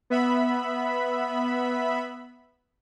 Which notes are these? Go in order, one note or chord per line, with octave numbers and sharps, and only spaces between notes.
B3 E5 B5